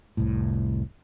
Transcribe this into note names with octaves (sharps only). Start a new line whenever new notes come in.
F1 C2 A2